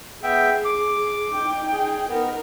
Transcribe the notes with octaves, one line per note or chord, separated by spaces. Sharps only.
B3 G#4 E5 G5
D6
D#4 G5
G#4
B3 D#4 A#4